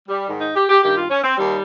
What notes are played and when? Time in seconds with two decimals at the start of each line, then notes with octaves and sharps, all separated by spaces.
0.09 G3
0.27 G#2 D#3
0.41 D#4
0.55 G4
0.69 G4
0.83 G2 D#3 G4
0.96 F4
1.11 C#4
1.23 C4
1.37 D#2 D#3 G3